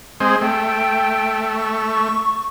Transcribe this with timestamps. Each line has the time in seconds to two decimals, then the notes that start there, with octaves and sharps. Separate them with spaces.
0.20 G#3 C4 G#4
0.42 A3 G5
1.54 C#6